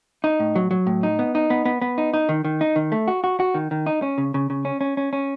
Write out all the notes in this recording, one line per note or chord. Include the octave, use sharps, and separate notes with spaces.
D#4
A2
F#3
F#3
A2
D#4
B3
D#4
B3
B3
B3
D#4
D#4
D#3
D#3
D#4
D#3
A3
F#4
F#4
F#4
D#3
D#3
D#4
C#4
C#3
C#3
C#3
C#4
C#4
C#4
C#4